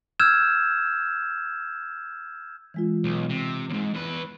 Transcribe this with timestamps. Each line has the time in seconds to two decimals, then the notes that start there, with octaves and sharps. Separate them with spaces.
0.20 E6 F6 G6 G#6 E7
2.74 E3 G#3 F4
3.04 B1
3.29 C3
3.70 D#2 G#2
3.94 E2 B4